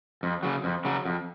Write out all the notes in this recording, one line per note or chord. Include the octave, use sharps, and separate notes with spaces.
F2
C#3 F#3
F2
C#3 F#3
F2